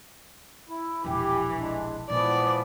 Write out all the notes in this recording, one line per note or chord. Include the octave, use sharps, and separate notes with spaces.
E4
E1 A#1 E3 G4
G#3 D4
A#2 E3 F3 G#3 B3 D5